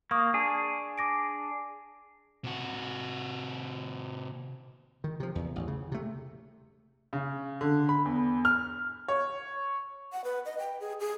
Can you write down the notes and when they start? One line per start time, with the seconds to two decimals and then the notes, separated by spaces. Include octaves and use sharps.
0.11 A#3 C#6 D#6
0.34 D4 G#4
0.98 D6 A#6 D7
2.44 C3 F#4
5.04 D#3
5.20 C3 F3
5.35 E2
5.56 A1
5.68 C#3
5.92 C3 A3
7.13 C#3
7.61 D3
7.89 B5
8.05 E2
8.45 F6
9.08 C#5
10.12 F#5
10.24 B4
10.45 D#5
10.59 G5
10.80 G#4
11.00 G#4